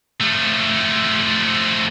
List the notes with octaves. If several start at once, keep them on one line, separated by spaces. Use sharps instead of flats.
F3 A3